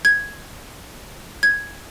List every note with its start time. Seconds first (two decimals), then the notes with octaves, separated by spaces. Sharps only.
0.05 G#6
1.43 G#6